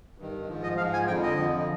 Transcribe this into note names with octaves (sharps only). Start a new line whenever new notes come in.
G2 D#3
G#2 F3
D#5
G#2 F3 F5
G#5
F2 D3 F3 G5
D#5
F2 D3 F3